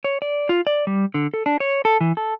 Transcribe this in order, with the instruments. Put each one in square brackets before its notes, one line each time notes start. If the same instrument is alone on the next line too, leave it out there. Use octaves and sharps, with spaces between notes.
[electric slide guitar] C#5
D5
F4
D5
G3
D3
A4
D4
C#5
A4
E3
A4